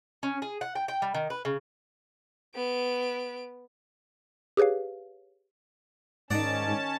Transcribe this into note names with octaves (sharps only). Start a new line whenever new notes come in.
C#4
G#4
F#5
G5
G5
G3
D#3
B4
C#3
B3 D7
G4 G#4 B4 C#5 F5
G#2 D#3 C#4 D#4 D5 F#5 A5